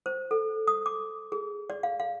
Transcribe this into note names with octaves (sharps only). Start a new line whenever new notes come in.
C5
A4
D#6
D6
G#4
D5
F5
F5